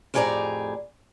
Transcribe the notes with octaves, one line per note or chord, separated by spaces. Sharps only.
F2 A2 G4 G#4 D5 A#5